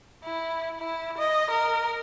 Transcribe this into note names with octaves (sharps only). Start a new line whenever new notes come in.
E4
E4
D#5
A#4